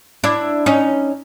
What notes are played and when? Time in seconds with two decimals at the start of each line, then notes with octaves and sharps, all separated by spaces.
0.24 D4 E4
0.66 C#4 D#4